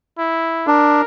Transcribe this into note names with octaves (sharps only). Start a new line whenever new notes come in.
E4
D4 A#4